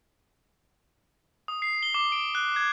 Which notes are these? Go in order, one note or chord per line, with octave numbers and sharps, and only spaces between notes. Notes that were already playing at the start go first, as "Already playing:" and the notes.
D#6
C7
G7
D6
D7
F#6
G#6